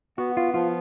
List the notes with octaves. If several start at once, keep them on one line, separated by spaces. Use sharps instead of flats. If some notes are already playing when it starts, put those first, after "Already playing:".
B3 F#4
F4
F3 F4